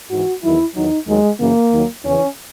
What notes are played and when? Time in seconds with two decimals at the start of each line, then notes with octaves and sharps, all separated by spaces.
0.11 G#2 E3 F#4
0.43 E2 D#3 F#3 E4
0.75 E2 D#3 F#3 D#4
1.08 D#2 D#3 F#3 G#3
1.40 F#2 C#3 E3 A#3
1.72 D#2 D#3 F#3
2.04 E2 C#3 E3 C#4